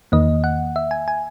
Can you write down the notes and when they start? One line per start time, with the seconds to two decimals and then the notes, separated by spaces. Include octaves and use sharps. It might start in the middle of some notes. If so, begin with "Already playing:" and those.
0.12 E2 D#3 A#3 D#5
0.44 F#5
0.76 E5
0.91 G#5
1.08 G#5